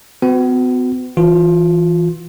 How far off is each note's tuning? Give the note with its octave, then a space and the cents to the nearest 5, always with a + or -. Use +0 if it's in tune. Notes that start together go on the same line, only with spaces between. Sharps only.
B3 +40 F#4 -15
E3 +0 F4 +20